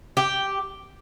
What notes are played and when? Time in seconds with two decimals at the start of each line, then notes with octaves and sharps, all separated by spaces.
0.17 G4